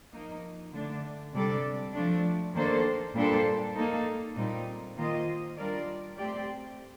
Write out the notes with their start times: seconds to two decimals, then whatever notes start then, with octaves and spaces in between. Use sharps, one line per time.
0.12 F3 A#3 D#4
0.72 D3 A3 D4
1.33 C3 G3 D4 A4 D5
1.93 F3 A3 D4
2.54 D#3 A#3 D4 A4 C5
3.14 A#2 G3 D4 A4 C5
3.75 A#3 D#4 A4
4.35 A#2 G3 C4 D#4
4.96 D#3 A#3 F4 C5 D#5
5.56 G3 D4 F4 A#4 D5
6.17 A3 C4 G4 D5